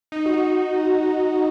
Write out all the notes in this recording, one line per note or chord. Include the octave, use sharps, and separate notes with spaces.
D#4
F#4
D#4